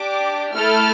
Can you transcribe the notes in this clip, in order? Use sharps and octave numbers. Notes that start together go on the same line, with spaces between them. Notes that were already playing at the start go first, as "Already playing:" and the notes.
Already playing: D4 G4 D6
A3 E4 A4 F6